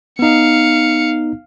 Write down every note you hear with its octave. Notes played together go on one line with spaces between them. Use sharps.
B3 D#4 F5 C#7